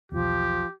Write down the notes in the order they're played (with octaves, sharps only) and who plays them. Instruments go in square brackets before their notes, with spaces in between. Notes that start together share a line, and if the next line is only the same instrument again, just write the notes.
[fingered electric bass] B1 E2 [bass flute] F3 [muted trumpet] G4